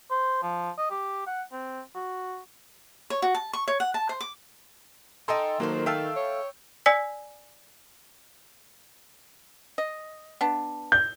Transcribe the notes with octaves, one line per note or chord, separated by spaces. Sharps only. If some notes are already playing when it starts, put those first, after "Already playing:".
C5
F3
D#5
G4
F#5
C4
F#4
C#5
F#4
A5
C#6
C#5
F#5
A5
C5
D6
D#4 A4 G5 G#5 A#5 C6
D#3 F#3 A#3 F4 A4 C5
A3 F5 G5 A5 E6
C#5
D5 G#5 E6 B6
D#5
B3 D4
G6